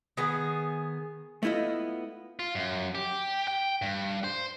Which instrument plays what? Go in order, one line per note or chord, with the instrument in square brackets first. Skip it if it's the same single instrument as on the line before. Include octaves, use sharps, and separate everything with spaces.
[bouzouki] D#3 B3 G#4
[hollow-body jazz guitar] A3 B3 E4 F4 D#5
[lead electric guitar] F4
F#2
G4
G5
G2
C5